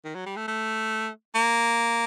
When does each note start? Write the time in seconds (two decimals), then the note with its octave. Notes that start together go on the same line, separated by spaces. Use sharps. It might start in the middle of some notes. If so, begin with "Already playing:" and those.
0.04 D#3
0.15 F#3
0.26 G3
0.36 A3
0.48 A3
1.35 A#3